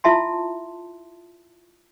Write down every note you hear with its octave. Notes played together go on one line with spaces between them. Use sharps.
E4 F4 E5 A5 C6